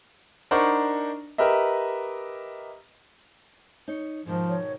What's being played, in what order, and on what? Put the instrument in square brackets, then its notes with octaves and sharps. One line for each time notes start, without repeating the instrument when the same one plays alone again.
[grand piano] D4 D#4 A#4 C5 F#5 C#6
G4 A#4 B4 D#5 E5
[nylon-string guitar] D#4 C#5
[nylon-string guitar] G#2 B2 D#3 [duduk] F3
[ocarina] C#5